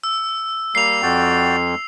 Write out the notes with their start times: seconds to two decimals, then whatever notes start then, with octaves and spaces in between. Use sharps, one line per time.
0.04 E6
0.75 G3 A#3 C7 F7
1.02 F2 F#4 D5 G5